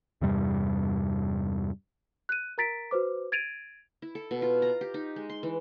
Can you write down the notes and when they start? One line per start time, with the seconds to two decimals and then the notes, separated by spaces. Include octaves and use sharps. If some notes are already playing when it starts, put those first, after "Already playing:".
0.21 E2 G2 C3 G3
2.29 F#6 D#7
2.58 A#4 A#5 A6 B6 D7
2.91 F#4 B4 C5 D6
3.32 G#6 A6 D7 D#7 F7
4.02 E4
4.15 A4
4.31 B2
4.42 F4
4.62 A#5
4.81 G4
4.94 D#4
5.16 G#3
5.30 C6
5.43 E3